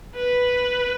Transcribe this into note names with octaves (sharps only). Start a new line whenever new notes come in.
B4